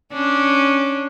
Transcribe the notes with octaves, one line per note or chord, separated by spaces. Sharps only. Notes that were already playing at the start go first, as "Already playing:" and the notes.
C#4 D4